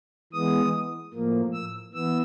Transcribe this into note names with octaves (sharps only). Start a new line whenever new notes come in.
E3 G#3 B3 D#6
A2 F3 A#3
E6
E3 B3 E6